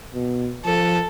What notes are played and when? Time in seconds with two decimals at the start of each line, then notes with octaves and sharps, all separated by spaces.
0.14 B2
0.66 F3 A4